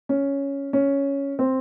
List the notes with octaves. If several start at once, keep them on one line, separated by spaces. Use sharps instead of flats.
C#4
C#4
C4